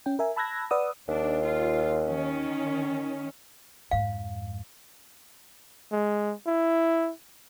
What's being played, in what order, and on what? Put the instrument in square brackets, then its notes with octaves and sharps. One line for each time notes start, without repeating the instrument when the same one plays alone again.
[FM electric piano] C#4 G5
A#4 E5 G#5
A5 B5 E6 F#6 G#6 A#6
B4 D5 F#5 D#6 E6
[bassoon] D#2 [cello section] D4
[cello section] F4
D#3 C#4
[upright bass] F2 G#2 [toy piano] F5
[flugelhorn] G#3
E4